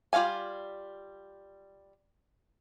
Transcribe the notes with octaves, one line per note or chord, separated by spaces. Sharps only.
G3 F4 A4 F5 G#5